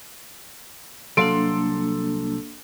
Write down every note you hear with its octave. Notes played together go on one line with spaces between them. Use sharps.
C2 F#3 A#3 D4 A4 F5 C6 D7